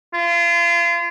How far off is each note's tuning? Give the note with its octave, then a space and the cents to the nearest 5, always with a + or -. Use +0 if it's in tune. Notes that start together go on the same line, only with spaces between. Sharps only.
F4 -30